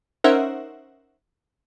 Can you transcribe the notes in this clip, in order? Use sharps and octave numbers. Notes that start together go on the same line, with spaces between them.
C#4 D#4 A#4 C5 E5 F#5